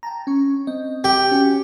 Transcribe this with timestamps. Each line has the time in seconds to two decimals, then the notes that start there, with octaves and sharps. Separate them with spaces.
0.03 G5 A5 A#5
0.27 C#4 C#6
0.67 C4 D#5
1.04 G4
1.31 C#4 F#4 G#5